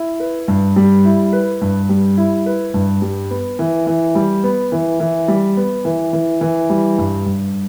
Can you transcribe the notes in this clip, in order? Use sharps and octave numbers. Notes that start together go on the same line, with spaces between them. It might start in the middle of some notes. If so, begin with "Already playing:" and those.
Already playing: E4
B4
G2
G3
E4
B4
G2
G3
E4
B4
G2
G3
B3
E3
E3
G3
B3
E3
E3
G3
B3
E3
E3
E3
G3
G2
G2